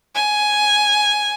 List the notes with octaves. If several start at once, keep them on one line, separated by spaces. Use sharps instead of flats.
G#5